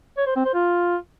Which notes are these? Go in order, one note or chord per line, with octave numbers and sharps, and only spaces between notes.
C#5
C5
C4
C5
F4